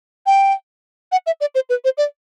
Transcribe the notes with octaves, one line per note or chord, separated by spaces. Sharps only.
G5
F#5
E5
D5
C5
B4
C5
D5